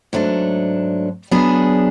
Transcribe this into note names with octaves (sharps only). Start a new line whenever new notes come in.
G#2 F#3 A3 D4
F#3 B3 D4 G#4